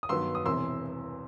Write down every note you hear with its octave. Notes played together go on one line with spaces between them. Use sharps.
D#6
G2 D#3 F#3 B3 C6 E6
D#6
E1 E2 C3 E3 C6 E6